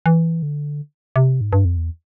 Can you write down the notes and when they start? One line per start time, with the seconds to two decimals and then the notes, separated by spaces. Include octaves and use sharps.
0.06 E3
0.43 D3
1.16 C3
1.41 G#2
1.53 G2
1.65 F2
1.77 E2